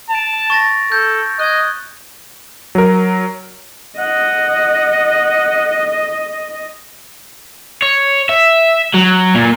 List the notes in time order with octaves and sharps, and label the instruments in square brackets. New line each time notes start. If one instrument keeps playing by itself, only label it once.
[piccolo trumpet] A5 [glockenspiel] D7 F7
[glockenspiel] C#6 A6 A#6
[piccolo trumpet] A4 [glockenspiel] G6
[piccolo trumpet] D#5 [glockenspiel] F#6 G#6
[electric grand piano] F#3 A#4
[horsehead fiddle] D#5 [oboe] F#5
[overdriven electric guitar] C#5
E5
F#3
A#2